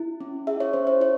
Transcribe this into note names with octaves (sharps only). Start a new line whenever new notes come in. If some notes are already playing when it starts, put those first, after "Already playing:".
Already playing: E4
C#4
G#4 E5
C#5
C#4 C5
C#5
E4 C#5